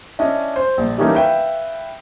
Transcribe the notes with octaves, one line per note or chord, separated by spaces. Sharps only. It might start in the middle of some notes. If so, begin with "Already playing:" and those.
C#4 D4 E4 D#5
C5
A#1
E3 A3 A#3 C#4 D#4 G4
B4 E5 F5 G5